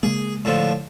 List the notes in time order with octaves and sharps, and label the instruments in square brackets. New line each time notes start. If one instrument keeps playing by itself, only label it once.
[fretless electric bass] C#3 G#3 A#3 [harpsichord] G#4
[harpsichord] A2 D3 F3